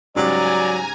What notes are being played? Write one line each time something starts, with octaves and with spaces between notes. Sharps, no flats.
G#2 C#3 F#3 G3 D5 G#5 A#5